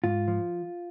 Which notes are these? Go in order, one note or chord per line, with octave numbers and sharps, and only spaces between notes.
G#2 F4
F3